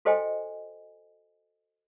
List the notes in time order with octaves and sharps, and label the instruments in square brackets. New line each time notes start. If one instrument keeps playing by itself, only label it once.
[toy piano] F#4 A4 C5 D#5 G5 G#5